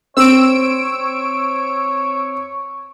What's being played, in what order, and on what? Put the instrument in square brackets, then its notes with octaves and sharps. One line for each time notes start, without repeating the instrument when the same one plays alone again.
[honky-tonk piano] C4 [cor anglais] C#5 [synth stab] E6 D7